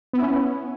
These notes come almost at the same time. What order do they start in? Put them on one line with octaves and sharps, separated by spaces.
B3 E4 C#4